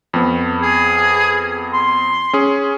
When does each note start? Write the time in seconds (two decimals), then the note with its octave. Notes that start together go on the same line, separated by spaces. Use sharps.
0.14 F2 B3
0.62 G#4
1.73 C6
2.33 C#4 G#4